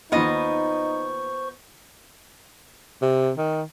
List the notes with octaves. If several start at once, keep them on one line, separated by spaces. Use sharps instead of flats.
D#2 D#3 B3 D#4 F4 C5 D#5 C#6
C3
D#3